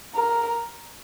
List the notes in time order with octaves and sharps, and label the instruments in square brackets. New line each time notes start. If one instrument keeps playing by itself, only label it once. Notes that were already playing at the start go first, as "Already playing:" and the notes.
[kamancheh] A#4